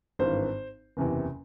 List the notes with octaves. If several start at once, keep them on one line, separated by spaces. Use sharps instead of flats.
G#1 G2 E3 C5
F#1 E2 C3 E3